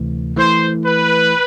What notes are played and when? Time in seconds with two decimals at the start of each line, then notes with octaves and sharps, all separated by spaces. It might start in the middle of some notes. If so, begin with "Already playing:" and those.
Already playing: D2 C3 E3 A3
0.37 E3 A3 E4 C5
0.85 B4